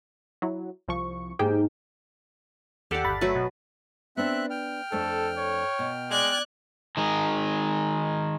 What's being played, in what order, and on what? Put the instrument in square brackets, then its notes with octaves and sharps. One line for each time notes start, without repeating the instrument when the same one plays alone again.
[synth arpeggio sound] F#3 E4
C2 F3 C#6
[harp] G#2 A#3 [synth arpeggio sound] G4 G#4 G5
[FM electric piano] D#2 [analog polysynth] G4 A4 F#5 [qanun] D5 F5
[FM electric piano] G1 B5 A6
[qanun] F#3 F#4 B4 [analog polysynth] A3
[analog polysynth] B2
[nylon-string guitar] B3 D4 [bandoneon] C4 E5 F#6
[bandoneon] G5 F6
[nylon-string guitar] F2 A3 D4 [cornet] A4
[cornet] C#5
[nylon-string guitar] B2
[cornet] G#3 [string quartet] D5 F#6 G#6
[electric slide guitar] D#3 G#3 D#4